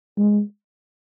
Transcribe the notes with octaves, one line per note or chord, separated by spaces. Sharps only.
G#3